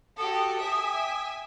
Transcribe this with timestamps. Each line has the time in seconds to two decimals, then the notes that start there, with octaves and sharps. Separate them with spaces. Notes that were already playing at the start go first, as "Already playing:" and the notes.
0.17 F#4 G4 A4 D#6
0.61 E5 G5 G#5